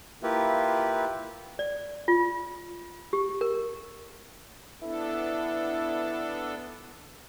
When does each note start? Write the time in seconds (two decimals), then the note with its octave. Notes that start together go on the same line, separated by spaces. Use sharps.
0.23 A#3 E4 F4 G4 B4
1.59 D5
2.08 F4
3.13 G4
3.41 A#4
4.82 B3 D4 E4 A4